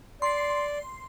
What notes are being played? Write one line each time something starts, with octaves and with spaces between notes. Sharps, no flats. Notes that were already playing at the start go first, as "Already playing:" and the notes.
D5 C6 C7